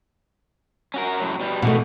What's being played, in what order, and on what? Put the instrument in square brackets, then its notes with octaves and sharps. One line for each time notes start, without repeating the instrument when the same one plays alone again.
[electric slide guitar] C#4 F#4 A#4
F#2 A2 F#3
B2 G3
[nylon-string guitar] B2 A3 [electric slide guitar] D#3 E3